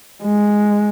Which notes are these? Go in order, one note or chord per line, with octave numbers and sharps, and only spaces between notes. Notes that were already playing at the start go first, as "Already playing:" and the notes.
G#3